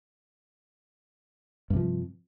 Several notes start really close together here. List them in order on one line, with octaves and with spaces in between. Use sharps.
G2 C3 F3